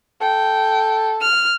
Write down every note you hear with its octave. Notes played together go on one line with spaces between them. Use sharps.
A4 G5
F6